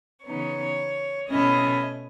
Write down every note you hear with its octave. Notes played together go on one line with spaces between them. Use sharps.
C#3 E3 B3 D#4 C#5
B2 A3 C#4 E4 D#5